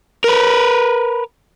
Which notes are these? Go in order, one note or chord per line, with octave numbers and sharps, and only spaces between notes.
A#4 B4